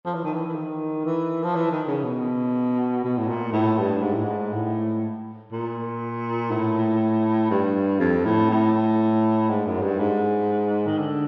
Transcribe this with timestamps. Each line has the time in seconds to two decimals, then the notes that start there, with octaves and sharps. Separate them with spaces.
0.06 F3
0.15 E3
0.24 D#3
0.34 E3
0.47 E3
0.55 D#3
1.05 E3
1.44 F3
1.55 E3
1.72 D#3
1.88 C#3
2.04 B2
3.04 B2
3.18 A2
3.29 A#2
3.53 A2
3.78 G2
4.02 G#2
4.14 A2
4.24 G#2
4.53 A2
5.52 A#2
6.51 A2
7.50 G2
8.00 F2
8.25 A2
8.50 A2
9.50 G#2
9.66 F#2
9.82 G2
9.99 G#2
10.87 D#3
10.98 D3